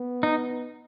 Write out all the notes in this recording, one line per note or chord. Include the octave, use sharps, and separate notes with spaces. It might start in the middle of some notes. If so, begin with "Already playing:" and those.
Already playing: B3
D#4